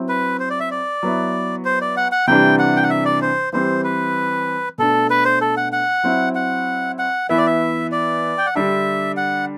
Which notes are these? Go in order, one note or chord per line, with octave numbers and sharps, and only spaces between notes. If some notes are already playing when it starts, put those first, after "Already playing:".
Already playing: F#3 C4 E4
B4
C5
D5
E5
D5
F#3 B3 E4
C5
D5
F#5
F#5
C3 E3 G3 D4 G5
F#5
G5
F#5
E5
D5
C5
E3 G3 C4 C5
B4
B2 A3 D4 A4
B4
C5
A4
F#5
F#5
F#3 C4 E4
F#5
F#5
E3 B3 E4 E5
D5
E5
D5
G5
F#5
D3 G3 D4 E5
F#5